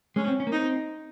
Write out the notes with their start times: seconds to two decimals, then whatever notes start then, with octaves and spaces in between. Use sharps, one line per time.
0.16 G#3 C#4
0.28 C4
0.40 C#4
0.47 A#3
0.52 C4 D#4